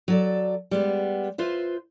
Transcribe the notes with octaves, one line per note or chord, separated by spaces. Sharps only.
F#3 A4 D5
G3 G#3 B3
F4 B4 C5 E5